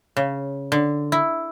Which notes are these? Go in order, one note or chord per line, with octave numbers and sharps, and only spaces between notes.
C#3
D3
E4